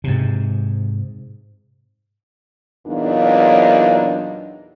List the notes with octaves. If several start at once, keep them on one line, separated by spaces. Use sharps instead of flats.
G#2 C3
E2 A#2 F#3 D4 D#4 F4